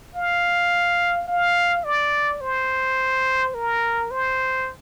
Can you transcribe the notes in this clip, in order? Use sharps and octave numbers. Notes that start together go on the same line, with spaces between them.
F5
F5
D5
C5
A#4
C5